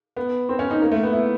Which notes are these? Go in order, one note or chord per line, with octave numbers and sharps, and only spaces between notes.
B3
C4
C#4
D#4
A#3
A3
B3
E4